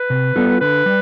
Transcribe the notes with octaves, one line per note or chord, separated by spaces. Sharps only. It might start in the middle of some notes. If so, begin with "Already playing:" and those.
Already playing: B4
C3
G3 B3 F4 A4
D3 B4
G3